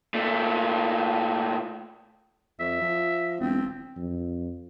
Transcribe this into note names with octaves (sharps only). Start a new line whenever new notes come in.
A#2 A3
F2 E5
F3
E1 C4
F2